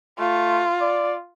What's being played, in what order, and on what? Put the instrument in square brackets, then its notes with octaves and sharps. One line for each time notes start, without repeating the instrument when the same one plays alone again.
[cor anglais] A3 [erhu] F4
[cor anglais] D5